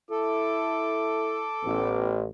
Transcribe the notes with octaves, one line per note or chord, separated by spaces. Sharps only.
E4 A4 D6
A1 B3